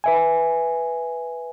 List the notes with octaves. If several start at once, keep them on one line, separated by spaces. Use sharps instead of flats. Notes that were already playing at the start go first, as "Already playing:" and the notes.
B4 E5 G#5